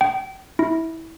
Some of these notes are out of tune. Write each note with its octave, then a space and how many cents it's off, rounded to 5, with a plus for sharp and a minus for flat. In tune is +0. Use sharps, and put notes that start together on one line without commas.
G5 -35
E4 -20